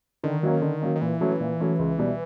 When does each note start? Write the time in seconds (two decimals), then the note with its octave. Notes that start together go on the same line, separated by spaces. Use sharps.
0.24 D3 D#3
0.43 F#3 A#3 C#4
0.62 D3
0.82 F#3 A#3 C#4
0.96 D#3
1.01 A#2 E3
1.21 F#3 A3 C#4
1.40 A#2
1.60 F#3 A3 C#4
1.79 C#2
1.99 B2 G3